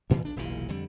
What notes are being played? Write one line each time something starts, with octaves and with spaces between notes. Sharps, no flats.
D2 A#2 E3
B1 D4
F1 B1 A#2 E3
F2 D3 G3